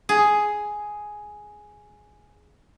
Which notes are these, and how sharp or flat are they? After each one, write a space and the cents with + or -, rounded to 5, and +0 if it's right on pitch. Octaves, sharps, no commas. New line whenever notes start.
G#4 +5